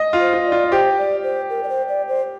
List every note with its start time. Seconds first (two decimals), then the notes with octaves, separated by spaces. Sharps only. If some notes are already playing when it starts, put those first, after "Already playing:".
Already playing: D#5
0.13 F4
0.20 C5
0.33 F4
0.46 D5
0.52 F4
0.71 G4 C5
0.98 D5
1.23 C5
1.50 A#4
1.63 D5
1.69 C5
1.88 D5
2.08 C5